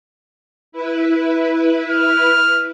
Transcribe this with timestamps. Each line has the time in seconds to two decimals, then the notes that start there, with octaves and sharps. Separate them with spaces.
0.72 E4 B4
1.88 F6